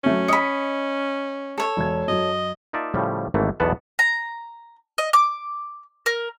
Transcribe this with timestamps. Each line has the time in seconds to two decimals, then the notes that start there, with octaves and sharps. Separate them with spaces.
0.04 F#3 A3 C#4 F#4
0.28 D#5 B5 C#7
1.58 A4 C#5
1.77 E1 G#6
2.08 F#2 F#3 D#5
2.73 A#3 D#4 F4 D5 E5 A5
2.94 A2 C#3 F3 G3
3.34 G#1 G#2 E3 A3 A#3
3.60 B1 E2 B2 B3 F#5 A5
3.99 A#5
4.98 D#5
5.13 D6
6.06 A#4